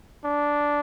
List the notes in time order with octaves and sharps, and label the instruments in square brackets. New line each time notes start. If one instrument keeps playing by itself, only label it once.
[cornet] D4